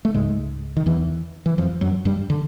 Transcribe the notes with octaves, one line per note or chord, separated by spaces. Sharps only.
A3
C#2 G#2 C#3 G#3
D#3
E2 E3
E3
F2 F3
F#2 F#3
G2 G3
D3